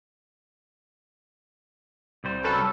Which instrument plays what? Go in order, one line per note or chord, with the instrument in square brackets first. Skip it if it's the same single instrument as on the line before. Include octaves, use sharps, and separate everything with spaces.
[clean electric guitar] C2 G3 C5
[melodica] F#3 C#4 B4 [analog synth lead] A4